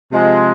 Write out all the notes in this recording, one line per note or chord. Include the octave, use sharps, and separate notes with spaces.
C3 F3 G#3